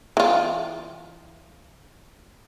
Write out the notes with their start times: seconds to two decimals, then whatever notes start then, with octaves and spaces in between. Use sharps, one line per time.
0.17 E3 F4